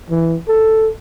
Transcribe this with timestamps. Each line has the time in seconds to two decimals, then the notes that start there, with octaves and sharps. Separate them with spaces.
0.10 E3
0.48 A4